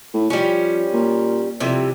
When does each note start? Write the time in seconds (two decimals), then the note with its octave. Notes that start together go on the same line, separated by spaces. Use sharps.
0.14 A2
0.30 F3 G3 C#4
0.93 A#2
1.60 F2 C3 E3 G3